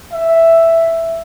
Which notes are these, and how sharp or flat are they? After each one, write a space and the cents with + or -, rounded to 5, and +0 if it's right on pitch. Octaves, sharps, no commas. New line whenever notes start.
E5 +5